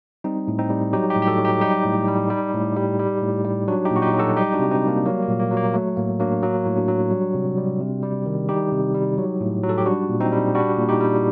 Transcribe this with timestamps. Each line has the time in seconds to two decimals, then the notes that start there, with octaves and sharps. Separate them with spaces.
0.24 G3 C4 D#4
0.48 A2
0.59 C4 D#4
0.70 G3
0.93 F#3 D#4 G4
1.10 D#4 G4
1.16 A2
1.22 G4
1.28 F#4 A4
1.39 F#3
1.45 D#4 G4
1.61 G3 D#4 G4
1.85 A2
2.08 G3
2.30 G3
2.54 A2
2.77 G3
2.99 G3
3.22 A2
3.45 G3
3.68 F#3 D4 F#4
3.85 D#4 G4
3.91 A#2
3.96 F#4
4.02 D#4 G4
4.14 F#3
4.19 F#4 A4
4.37 G3 D#4 G4
4.54 D4 F#4
4.59 C3
4.71 C4 D#4
4.82 G3
4.88 A#3 D4
5.05 F#3 A#3
5.22 A#3
5.28 A#2
5.39 A#3
5.51 F#3
5.57 A#3
5.74 F#3 A3
5.97 A2 A#3
6.20 F#3 A#3 D4
6.43 F#3 A#3
6.66 A2
6.76 D4 F#4
6.88 F#3
7.11 G3
7.34 C3
7.57 G3
7.80 C3
8.03 G3
8.26 D#3
8.49 G3 D#4 G4
8.72 C3
8.95 G3
9.18 F#3
9.41 A2
9.63 F#3
9.69 A4
9.78 G4
9.86 G3 D4 F#4
10.09 A#2
10.20 C4 D#4
10.32 G3
10.55 G3 D4 F#4
10.78 A#2
10.89 D#4 G4
11.01 G3